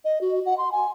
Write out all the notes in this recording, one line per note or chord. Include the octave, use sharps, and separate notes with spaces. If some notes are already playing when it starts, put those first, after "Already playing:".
D#5
F#4
F#5
C6
G#5